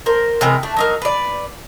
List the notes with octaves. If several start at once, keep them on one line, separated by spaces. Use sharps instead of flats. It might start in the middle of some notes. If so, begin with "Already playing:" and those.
A#4 C5
C3 E3 G#3 A#4
A3 D4
F#3 D#4 A#4
B4 D5